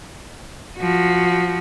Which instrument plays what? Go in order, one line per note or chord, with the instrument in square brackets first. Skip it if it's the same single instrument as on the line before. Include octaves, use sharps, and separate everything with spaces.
[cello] F3 F#4